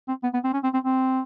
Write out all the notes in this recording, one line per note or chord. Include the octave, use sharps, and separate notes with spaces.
C4
B3
B3
C4
C#4
C4
C4
C4